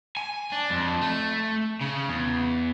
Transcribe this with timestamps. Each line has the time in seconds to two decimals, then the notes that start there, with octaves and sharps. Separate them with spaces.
0.17 G#5
0.52 D4
0.70 F2
1.01 A3
1.81 C#3
2.08 E2